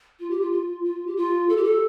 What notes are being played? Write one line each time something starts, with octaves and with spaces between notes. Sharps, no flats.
F4
G4
F4
F4
F4
G4
F4
A4
G4
A4